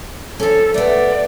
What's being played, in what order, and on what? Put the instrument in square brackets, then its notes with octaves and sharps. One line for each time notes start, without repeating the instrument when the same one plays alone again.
[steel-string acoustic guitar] F3 C#4 [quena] A4
[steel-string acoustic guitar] A3 B3 [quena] D5